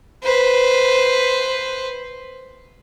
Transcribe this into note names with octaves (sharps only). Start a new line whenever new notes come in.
B4 C5